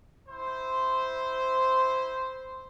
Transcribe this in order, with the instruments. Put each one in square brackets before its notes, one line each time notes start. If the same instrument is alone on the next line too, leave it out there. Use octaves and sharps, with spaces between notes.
[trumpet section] E4 C5